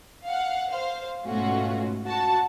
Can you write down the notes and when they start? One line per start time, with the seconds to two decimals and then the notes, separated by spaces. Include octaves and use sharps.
0.24 F5 F#5
0.70 C5 F5
1.24 G#2 B2 A3 C#4 F4 F#4
2.05 F#4 A5